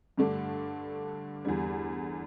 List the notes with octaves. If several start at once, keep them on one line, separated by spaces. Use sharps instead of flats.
G2 D3 A3 D4
E2 D3 G3